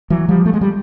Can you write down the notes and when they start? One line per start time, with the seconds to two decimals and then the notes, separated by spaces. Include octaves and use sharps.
0.10 E3 F#3
0.28 F3 G3
0.46 A3
0.54 G#3
0.61 G3